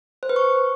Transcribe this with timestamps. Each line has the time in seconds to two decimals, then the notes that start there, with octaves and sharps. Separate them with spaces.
0.23 C5
0.29 B4
0.36 C#6